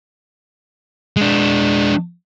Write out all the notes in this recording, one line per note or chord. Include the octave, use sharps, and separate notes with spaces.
G#3 D4